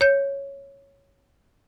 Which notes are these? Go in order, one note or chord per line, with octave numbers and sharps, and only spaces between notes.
C#5 G6